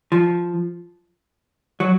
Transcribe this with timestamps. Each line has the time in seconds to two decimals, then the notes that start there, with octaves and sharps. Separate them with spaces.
0.12 F3
1.80 F#3